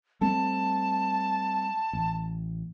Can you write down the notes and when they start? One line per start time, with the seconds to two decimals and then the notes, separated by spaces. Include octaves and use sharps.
0.21 G3 A3 C4 A5
1.93 A1